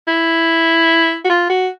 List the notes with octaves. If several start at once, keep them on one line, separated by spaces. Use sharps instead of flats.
E4
F#4
F4
F#4